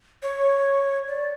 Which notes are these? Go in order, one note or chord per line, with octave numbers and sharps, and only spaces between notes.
C#5
D5